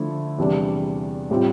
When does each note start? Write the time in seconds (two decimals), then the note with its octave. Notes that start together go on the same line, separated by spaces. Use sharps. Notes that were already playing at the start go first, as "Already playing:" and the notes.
Already playing: D3 F3 A3 E4
0.38 E2 C3 G3 D4
1.30 A2 G3 C4 F4